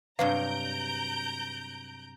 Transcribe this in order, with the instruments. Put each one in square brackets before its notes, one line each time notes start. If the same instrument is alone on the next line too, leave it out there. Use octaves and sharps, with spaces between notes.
[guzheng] G2 C3 F#3 [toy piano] B4 [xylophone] F5 [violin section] A#5 G6 D7